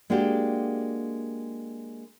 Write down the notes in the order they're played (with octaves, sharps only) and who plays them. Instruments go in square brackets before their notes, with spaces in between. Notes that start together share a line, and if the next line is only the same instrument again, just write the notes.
[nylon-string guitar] G#3 A#3 D4 F#4 G4